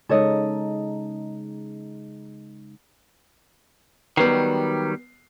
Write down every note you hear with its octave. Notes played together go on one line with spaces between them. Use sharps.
C#3 G#3 D#4 A4 C#5 D#5
D#3 F#3 G3 B3 C7